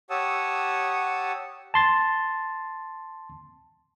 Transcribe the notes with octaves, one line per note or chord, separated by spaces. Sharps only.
G4 C#5 F#5 A5 D#6 E6
A5 C6 A6